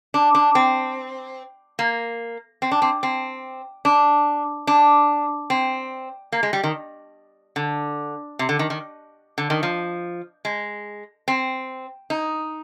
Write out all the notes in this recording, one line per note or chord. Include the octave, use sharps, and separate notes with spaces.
D4
D4
C4
A#3
C4
D4
C4
C4
D4
D4
C4
A#3
G#3
G3
D#3
D3
C3
D3
D#3
D#3
D3
D#3
F3
G#3
C4
D#4